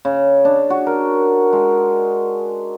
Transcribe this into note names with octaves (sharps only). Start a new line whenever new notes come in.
C#3
D4
F#4
A#4
G#3